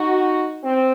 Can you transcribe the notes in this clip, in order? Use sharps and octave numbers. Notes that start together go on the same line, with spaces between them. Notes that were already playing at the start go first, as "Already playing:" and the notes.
Already playing: D#4 F#4
C4